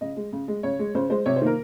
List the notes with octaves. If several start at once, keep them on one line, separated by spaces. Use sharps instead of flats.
C#3 D#5
G#3
C#3
G#3
C#3 C#5
G#3
C#3 C5
G#3 C5
C3 C#5
C5
D#3 A#3 A#4